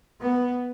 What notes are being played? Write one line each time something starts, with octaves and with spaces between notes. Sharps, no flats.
B3